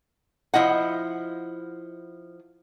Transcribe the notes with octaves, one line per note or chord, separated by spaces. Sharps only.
F3 E4 D#5 F#5